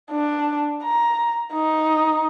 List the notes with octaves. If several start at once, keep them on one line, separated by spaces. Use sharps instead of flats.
D4
A#5
D#4